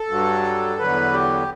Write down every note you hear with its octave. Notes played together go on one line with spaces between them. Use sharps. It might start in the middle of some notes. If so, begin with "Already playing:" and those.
Already playing: A4
G2 F#3
E2 D3 F#3 B4
G4